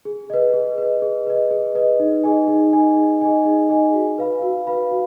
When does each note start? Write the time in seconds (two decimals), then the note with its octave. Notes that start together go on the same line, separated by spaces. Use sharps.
0.05 G#4
0.30 B4 D#5
0.54 G#4
0.78 B4 D#5
1.02 G#4
1.27 B4 D#5
1.51 G#4
1.75 B4 D#5
1.99 D#4
2.24 G#4 D#5 G#5
2.48 D#4
2.73 G#4 D#5 G#5
2.97 D#4
3.21 G#4 D#5 G#5
3.46 D#4
3.69 G#4 D#5 G#5
3.94 F#4
4.18 B4 F5 B5
4.42 F#4
4.67 B4 F5 B5
4.91 F#4